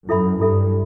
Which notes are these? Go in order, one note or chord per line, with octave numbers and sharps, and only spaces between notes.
F#2 E4 A4 E5 B5
G2 E4 A4 E5 B5